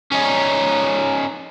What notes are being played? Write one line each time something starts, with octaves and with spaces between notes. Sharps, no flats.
C#4 D#4